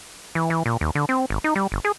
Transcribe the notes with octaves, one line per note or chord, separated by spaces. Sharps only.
E3
E3
A#2
D#2
D3
C4
G#1
D#4
G3
G1
G#4